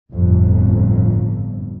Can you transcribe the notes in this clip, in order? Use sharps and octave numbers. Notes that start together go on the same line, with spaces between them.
G1 F2 A2